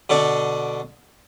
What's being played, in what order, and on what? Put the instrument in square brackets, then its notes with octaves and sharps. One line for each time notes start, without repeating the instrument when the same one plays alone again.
[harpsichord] B2 D3 D4